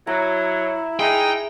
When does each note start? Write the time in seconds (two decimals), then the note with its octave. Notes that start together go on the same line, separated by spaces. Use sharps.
0.07 F#3 E4 A#5
1.00 G#3 D#4 G#4 E5 G5